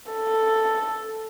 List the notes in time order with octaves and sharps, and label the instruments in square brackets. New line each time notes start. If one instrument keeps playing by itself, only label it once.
[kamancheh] A4